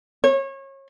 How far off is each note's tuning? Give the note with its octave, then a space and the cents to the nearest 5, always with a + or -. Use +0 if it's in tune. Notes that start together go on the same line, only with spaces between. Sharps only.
C#5 -30